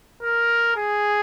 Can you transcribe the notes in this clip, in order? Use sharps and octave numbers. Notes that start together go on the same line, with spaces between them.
A#4
G#4